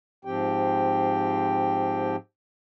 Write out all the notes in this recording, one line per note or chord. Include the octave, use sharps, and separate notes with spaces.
G#2 F3 C4 G4 G5